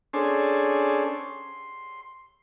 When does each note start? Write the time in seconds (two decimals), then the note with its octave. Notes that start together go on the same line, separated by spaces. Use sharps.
0.13 C#4 D4 G#4 A4 C5
1.04 C6